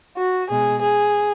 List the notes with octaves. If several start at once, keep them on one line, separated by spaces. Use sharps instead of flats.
F#4
B2 G#3 G#4
G#4